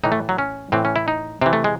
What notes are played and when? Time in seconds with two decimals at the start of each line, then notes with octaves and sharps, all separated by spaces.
0.04 A2 E3 D#4
0.12 A3
0.29 F#3
0.38 C#4
0.72 A2 E3 C4
0.85 C#4
0.96 E4
1.08 D#4
1.41 C3 E3 C4
1.53 A3
1.64 G#3